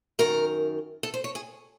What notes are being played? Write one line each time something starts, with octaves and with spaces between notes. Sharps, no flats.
F#2 D#3 A#4
A4
C5
C#5
G#4